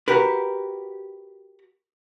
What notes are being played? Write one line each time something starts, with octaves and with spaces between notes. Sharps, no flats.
F#4 G4 A#4 B4